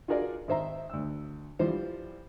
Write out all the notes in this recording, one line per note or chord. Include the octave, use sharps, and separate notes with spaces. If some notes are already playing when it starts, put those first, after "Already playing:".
F4 F#4 G#4 A#4 D5
G#1 D#3 C5 E5 A#5
D2 E6
E3 F3 G3 C5